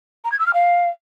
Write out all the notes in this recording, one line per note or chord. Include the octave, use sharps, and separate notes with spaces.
A#5
G#6
E6
F6
F5